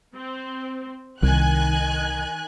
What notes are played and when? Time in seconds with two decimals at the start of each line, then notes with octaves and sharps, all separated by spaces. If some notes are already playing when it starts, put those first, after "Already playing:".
0.14 C4
1.23 C2 D#3 G#5 F#6